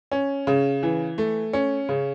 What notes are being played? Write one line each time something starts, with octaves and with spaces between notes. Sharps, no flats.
C#4
C#3
E3
A3
C#4
C#3